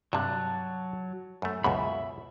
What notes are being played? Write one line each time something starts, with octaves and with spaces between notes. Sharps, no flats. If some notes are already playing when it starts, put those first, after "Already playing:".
G2 C3 F#3 A5 F#6
F#2 A3
C#2 F#2 B2 E5 B5